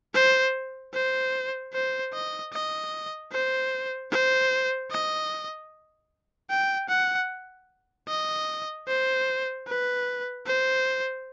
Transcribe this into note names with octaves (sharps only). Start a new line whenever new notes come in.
C5
C5
C5
D#5
D#5
C5
C5
D#5
G5
F#5
D#5
C5
B4
C5